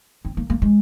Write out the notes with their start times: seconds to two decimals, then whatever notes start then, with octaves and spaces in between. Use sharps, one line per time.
0.25 C4
0.37 A#3
0.50 A#3
0.62 G#3